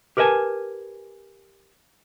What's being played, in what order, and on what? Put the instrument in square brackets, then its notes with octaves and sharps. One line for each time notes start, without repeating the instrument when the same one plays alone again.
[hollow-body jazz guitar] G4 A#4 B4 D#5 G#5 A5